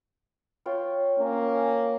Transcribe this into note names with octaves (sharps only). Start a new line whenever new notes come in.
F4 C#5 G5
A#3 C#4